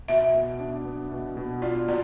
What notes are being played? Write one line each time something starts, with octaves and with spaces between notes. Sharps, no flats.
B2 E5
B2
D4
B3
B2
B2
F4 D5
B2 D5